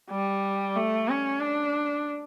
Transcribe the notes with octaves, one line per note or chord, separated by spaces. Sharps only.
G3
A3
C#4
D4